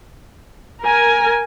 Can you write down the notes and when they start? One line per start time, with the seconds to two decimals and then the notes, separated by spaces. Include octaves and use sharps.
0.82 A#4 G#5